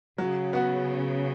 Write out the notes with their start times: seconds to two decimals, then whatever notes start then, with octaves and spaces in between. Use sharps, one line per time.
0.18 C#3 F#3
0.53 B3 F#4